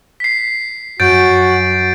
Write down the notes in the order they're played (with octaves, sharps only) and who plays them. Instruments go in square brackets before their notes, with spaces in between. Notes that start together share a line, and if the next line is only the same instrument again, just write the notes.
[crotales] B6 C7
[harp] F#2 [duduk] F#4 [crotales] G6 A6 D7